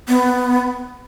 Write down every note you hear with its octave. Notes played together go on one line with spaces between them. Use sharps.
B3